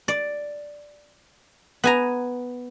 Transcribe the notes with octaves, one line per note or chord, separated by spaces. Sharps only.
D5
B3 G#5 A#5